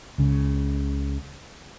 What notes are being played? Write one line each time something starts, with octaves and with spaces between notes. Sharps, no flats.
C#2 C#3